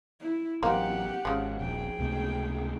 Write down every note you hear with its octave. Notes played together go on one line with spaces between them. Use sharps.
E4
A1 F#3 A#3 C4 D#4 G4 F#5
G#1 C#3 F3
D#1 A#1 G#4 G5
C#2 C3 A3